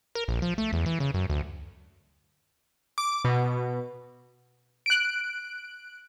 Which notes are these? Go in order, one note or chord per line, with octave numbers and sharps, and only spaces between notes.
A#4
A#1
F3
A3
E2
E3
C#3
F#2
D2
D6
B2
F#6 D7